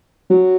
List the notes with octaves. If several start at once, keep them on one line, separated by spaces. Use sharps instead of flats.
F#3